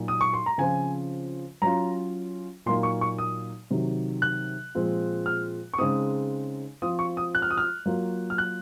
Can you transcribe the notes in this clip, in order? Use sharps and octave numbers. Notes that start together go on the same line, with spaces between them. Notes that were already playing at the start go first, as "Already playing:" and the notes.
Already playing: A#2 F#3 A#3 D#4
D#6
C#6
C6
A#5
C#3 F3 C4 F4 G#5
F#3 C#4 F4 A#5
A#2 F#3 A#3 D#4 C6
C#6
C#6
D#6
C3 D#3 F#3
F#6
A#2 F3 G#3 C4 F4
F6
C#6
C#3 G#3 C4 D#4 D#6
F3 C4 F4 D#6
C#6
D#6
F#6
F6
D#6
F6
F#3 A#3 F4
F6
F#6